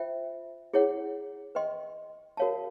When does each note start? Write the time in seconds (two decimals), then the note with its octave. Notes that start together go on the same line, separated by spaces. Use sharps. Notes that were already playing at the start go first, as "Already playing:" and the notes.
Already playing: F4 C5 E5 G5
0.73 E4 G#4 C#5 F#5
1.55 B4 D#5 G5 C6
2.37 F#4 A#4 C#5 F5 A5